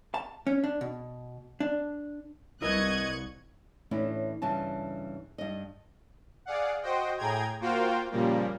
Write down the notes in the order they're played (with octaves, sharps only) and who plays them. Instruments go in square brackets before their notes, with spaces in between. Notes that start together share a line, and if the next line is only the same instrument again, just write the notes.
[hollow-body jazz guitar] A5
C#4
D4
B2
D4
[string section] C2 [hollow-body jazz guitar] E4 A#4 B4 [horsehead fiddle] D#5 [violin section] C#6 F#6 G#6
[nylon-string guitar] A2 E3 C#4 D4 E4
G2 C#3 E3 A5
G2 D#5
[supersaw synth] G#4 D5 F5 F#5
F#4 C5 D#5 G5
A2 G#4 G5 A#5 G#6
A#3 F4 F#4 C5 F5 G5
A#2 C#3 F3 G3 A#3